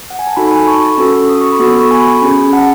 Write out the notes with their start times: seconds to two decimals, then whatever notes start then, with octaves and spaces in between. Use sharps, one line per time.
0.10 F#5
0.19 G#5
0.27 A5
0.37 D#4 F#4 A4 G#5 B5
0.52 G#5 B5
0.68 A5 C#6
0.98 C#4 F#4 A4
1.29 D#6
1.41 C#6
1.52 B5 D#6
1.59 B3 F#4 A4
1.81 C#6
1.91 G#5 B5
2.22 C#4 G#4
2.53 F#5 A5